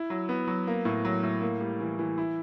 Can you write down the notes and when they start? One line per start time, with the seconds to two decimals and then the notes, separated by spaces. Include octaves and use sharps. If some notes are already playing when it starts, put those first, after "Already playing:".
Already playing: E4
0.10 F#3
0.29 B3
0.47 F#3
0.67 A#3
0.85 A2
1.05 F#3
1.23 A2
1.41 A#3
1.61 G3
1.80 E3
1.99 E3
2.18 E4